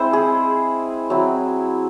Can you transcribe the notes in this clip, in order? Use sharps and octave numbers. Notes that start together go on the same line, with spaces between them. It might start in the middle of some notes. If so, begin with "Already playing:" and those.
Already playing: G#3 C4 E4 C5
G#4
F#3 C4 E4